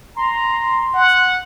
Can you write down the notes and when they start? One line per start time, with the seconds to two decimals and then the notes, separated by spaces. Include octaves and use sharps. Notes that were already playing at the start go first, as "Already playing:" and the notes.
0.17 A#5 C6
0.94 F#5